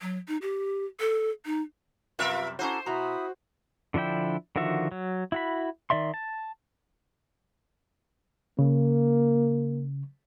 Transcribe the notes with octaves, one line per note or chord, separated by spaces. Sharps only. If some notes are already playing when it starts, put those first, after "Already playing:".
F#3
D#4
G4
A4
D#4
F#2 C3 G3 F4 A#4 B4 E5
C#4 E4 F#4 A4 C5 A#5 D6
B2 E4 F#4 E5 A#5 D#6
D3 F3 D4 E4 G5
D3 D#3 F3 F#4 E5
F#3
E4 F#4 B5
D#3 D5 E5 C6
A5
C#3 A#3